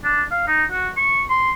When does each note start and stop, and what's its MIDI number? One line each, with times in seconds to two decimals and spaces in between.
0.04 0.23 62
0.31 0.43 77
0.48 0.64 63
0.71 0.89 66
0.97 1.23 85
1.30 1.53 84